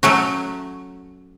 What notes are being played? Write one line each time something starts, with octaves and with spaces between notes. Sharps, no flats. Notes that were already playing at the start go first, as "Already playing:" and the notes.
F#3 A3 C#4 F#4